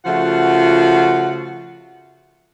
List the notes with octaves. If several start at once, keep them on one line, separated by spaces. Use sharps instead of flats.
C#3 F3 A3 F4 F#4 F#5